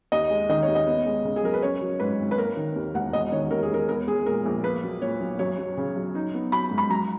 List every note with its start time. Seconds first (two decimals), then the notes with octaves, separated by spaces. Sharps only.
0.12 D#2 D#5
0.30 G#3
0.49 D#3 D#5
0.62 C#5
0.68 D#2
0.75 D#5
0.87 B3
1.06 G#3
1.24 C#3
1.36 G#4
1.43 F#2 A#4
1.54 B4
1.62 C#4 C#5
1.82 F#3
2.00 G#2 B4
2.19 G#1
2.31 B4
2.38 A#3 A#4
2.57 D#3
2.76 D#2
2.94 E1 F#5
3.13 E1 D#5
3.32 D#3 C#5
3.51 D#2 A#4
3.63 G#4
3.70 E1 A#4
3.88 B3 A#4
4.08 G#3 G#4
4.26 A#2 A#4
4.46 A#1
4.64 A#3 B4
4.83 F#3
5.02 A#2 C#5
5.21 B1
5.39 F#2 C#5
5.58 F#3
5.77 C#3
5.96 F#2
6.15 D#4
6.34 B3
6.52 F#3 B5
6.71 G#2
6.78 B5
6.90 F#2 A#5